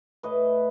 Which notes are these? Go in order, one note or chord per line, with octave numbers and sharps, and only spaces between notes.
A2 B4 D#5